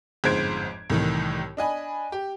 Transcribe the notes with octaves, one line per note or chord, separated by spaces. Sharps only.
G1 F2 G#2 C5 G#6 D7
C2 A2 D#3 E3
D4 D#5 G#5 B5
G4